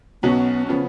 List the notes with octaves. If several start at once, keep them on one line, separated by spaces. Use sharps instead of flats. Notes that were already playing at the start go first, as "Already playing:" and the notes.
B1 B2 F#3 B3 C#4 F#4
C#3 F3 B3 C#4